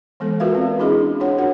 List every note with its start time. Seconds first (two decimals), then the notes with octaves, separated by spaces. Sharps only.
0.20 E3 G#3 B3 A4
0.40 F4 F#4 A#4 B4 E5 F5
0.55 C4 D5
0.79 C#4 D4 E4 G#4 D#5 B5
1.20 D4 F4 C#5 F#5
1.38 F#4 A#4 F#5